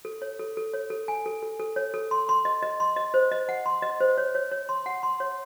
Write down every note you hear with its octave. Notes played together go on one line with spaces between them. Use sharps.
A4
C#5
A4
A4
C#5
A4
G#5
A4
A4
A4
C#5
A4
C6
C6
D#5
D#5
C6
D#5
C5
D#5
F#5
C6
D#5
C5
C#5
C#5
C#5
C6
F#5
C6
C#5